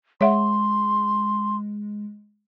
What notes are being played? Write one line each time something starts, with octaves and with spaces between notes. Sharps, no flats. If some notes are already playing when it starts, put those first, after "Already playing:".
G#3 C#5 E5 F#5 C6